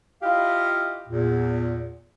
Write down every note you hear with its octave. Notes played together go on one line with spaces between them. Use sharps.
E4 F4 G4 D#5 F5
E2 A#2